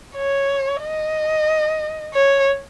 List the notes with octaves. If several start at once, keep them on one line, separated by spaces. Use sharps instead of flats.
C#5
D#5
C#5